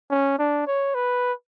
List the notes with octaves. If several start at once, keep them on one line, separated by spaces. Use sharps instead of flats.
C#4
D4
C#5
B4